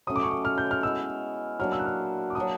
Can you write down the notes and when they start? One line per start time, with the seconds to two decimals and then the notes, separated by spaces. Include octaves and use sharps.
0.07 F#3 A3 C#4 D#6
0.16 D6
0.23 C#6
0.31 D6
0.45 F6
0.58 G6
0.71 F6
0.83 G#3 B3 E4 E6
1.60 F#3 A#3 D4 F6
1.72 E6
1.79 F#6
1.85 F6
2.30 D6
2.35 F#3 A#3 D4 D#6